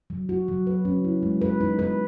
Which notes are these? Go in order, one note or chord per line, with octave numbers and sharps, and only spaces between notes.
F#3
F#4
F#3
B4
C#4
E4
G#3
B4
D#4
B4